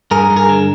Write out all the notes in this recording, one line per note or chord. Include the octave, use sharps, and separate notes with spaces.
G2 G#4 A#4
G2
G#4 A#4
D3